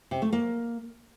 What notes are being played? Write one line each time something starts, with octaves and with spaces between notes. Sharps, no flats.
C3
A3
A#3